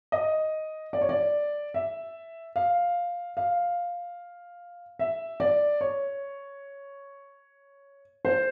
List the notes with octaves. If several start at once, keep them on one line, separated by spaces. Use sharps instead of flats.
D#5
D5
C#5
D5
E5
F5
F5
E5
D5
C#5
C5